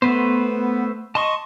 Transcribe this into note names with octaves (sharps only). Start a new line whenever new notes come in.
A3 B3 B4 C5
D#5 A5 C6 C#6